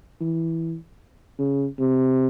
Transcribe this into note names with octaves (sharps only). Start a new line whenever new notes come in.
E3
C#3
C3